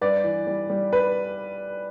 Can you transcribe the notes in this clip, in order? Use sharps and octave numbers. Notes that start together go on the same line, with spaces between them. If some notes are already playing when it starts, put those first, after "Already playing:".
G2 B4 D5
E3
G3
G3
B4